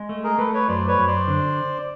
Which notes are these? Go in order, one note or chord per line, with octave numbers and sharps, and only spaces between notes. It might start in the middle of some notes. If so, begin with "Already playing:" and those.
Already playing: G#3
A3
G#4 A#4
A3 A4 B4
B4 C#5
F#2 C5 D5
B4 C#5
F#2
C5 D5
D3